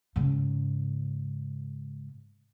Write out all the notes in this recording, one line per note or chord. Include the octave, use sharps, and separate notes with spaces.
G#2 C#3